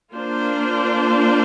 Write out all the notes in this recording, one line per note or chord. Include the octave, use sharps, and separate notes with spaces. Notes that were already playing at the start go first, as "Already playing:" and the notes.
A#3 D4 F4 C5